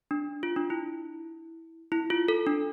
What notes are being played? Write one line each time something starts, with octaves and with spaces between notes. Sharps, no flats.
D4
F4
D4
E4
E4
F4
A4
D4